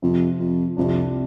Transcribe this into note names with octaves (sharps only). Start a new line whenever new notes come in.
F2 C3 F3 C4
F2
C2 F2 C3 G3 D4